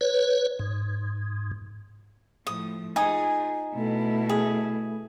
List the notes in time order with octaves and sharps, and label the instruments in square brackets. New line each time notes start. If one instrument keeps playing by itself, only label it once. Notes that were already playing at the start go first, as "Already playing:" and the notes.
[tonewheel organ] B4 C#5
G#2
[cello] A2 F3 [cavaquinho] D#6
[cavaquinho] D#4 G#5 D#6 [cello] F4 G#4
[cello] B2 E4 [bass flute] A3
[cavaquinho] G#4